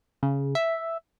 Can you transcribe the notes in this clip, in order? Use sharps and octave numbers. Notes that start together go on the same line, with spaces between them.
C#3
E5